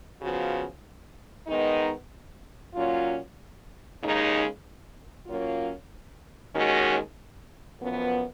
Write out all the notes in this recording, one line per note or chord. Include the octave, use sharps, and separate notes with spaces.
C#3 F3 B3 F#4
D#3 G#3 B3 D#4
A#2 F#3 C#4 F4
D#2 C#3 G#3 D#4
F#3 A#3 C#4 F4
D#2 D#3 G#3 C#4 F#4
F#2 F3 B3